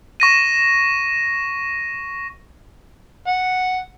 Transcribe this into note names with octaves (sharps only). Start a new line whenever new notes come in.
C#6 A#6 D#7
F#5